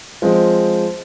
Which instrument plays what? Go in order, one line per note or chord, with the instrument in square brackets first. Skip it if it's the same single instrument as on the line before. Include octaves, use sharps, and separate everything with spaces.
[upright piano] F3 G#3 C4